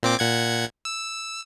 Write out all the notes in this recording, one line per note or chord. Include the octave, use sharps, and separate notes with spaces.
A#2 C4 D6
A#2 F#5 G#6
E6